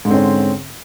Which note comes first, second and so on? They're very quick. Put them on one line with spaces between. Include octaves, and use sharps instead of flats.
G#2 D3 C4 C#4